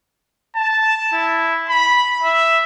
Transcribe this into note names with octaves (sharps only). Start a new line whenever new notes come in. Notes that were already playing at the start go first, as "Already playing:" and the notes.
A5
E4
B5
E5